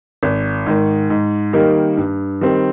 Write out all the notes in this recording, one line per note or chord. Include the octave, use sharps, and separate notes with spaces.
G#1
G#2 D#3
G#2
D#3 G3 A#3 D#4
G2
D#3 G3 C4